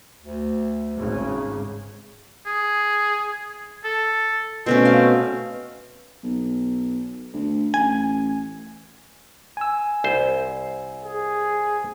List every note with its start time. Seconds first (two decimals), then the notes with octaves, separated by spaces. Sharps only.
0.22 D2
0.94 G#1 C#3
2.46 G#4
3.84 A4
4.66 B2 A3 C4 C#4
4.85 F5
6.23 B1
7.33 D2
7.74 A1 G#5
9.57 G#5 E6
10.04 C2 C5
11.04 G#4